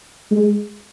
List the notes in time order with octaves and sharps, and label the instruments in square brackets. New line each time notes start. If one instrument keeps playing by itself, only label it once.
[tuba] G#3